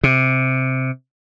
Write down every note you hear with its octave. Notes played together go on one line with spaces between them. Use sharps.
C3